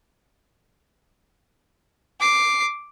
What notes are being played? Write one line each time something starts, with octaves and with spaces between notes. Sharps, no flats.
D6 C7